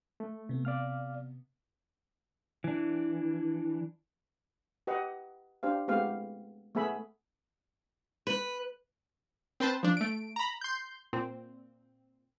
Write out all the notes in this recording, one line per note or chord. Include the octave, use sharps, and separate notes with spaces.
A3
C3 B3
D5 F5 F6
E3 D4
G4 B4 D#5 F#5
D4 G4 C5 F5
G#3 A3 B3 C4 G4 F5
A3 B3 G#4 E5 B5
B4
C4 B4 C5 A5
F3 D4
A3 D7
A#5 B5
C6 G6
A#2 C4